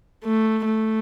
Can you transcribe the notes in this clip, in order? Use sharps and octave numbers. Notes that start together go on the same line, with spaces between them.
A3
A3